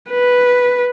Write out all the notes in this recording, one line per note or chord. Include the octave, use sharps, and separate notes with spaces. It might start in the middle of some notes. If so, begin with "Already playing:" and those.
B4